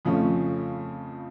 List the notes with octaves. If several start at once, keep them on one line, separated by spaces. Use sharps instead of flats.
F2 C#3 F3 A3 C#4